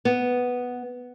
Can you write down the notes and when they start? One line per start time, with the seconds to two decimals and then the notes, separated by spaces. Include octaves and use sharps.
0.05 B3